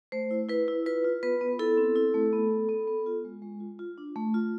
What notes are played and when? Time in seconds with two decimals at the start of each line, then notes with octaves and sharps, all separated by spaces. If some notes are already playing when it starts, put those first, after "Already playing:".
0.12 A3 C5
0.31 E4
0.49 E4 B4
0.68 E4
0.86 F4 B4
1.04 F4
1.23 B3 B4
1.41 B3
1.59 E4 A4
1.77 C4
1.96 E4
2.14 A3
2.33 B3
2.51 B3
2.69 B3
2.87 B3
3.06 F4
3.25 G#3
3.42 G#3
3.60 F4
3.79 F4
3.98 D4
4.16 A3
4.34 F4